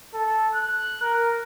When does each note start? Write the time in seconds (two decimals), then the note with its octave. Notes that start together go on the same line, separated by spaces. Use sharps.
0.14 A4
0.54 F#6
1.02 A#4